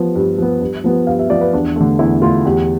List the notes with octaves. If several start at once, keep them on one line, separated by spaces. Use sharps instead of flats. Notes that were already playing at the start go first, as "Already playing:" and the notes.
Already playing: F3 B3
G2
F3 B3
G2
F3 B3
G2 F5
E5
F3 B3 D5
B4
E2 D4
D3 A3
E2 E4
D3 A3 F4
E2 G4